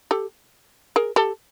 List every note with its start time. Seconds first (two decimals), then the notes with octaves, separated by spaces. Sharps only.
0.11 G4 A4
0.96 G#4 A#4
1.16 G4 A4